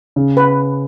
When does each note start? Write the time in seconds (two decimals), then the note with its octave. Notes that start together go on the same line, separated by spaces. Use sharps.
0.16 C#3
0.37 B4